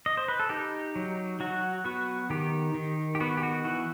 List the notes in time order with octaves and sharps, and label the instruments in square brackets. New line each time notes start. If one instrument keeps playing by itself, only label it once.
[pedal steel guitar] D#5
C5
B4
A4
D#4 G4
F#3
F#3 F#4
B3 F#4
D#3 G4
D#3
G4
B3 F#4
G4
F#4
E3 F#4